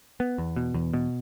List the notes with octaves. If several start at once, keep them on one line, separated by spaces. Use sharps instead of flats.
B3
E2
B2
E2
B2